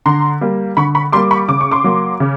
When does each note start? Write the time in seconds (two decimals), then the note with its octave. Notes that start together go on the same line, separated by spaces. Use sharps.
0.06 D3 A#5 C6
0.41 G3 A#3
0.77 D3 B5 C#6
0.95 B5 C#6
1.12 G3 A#3 C6 D6
1.31 B5 C#6
1.49 C#3 D6
1.61 C#6
1.71 C6 D6
1.84 F#3 A#3
2.20 C#3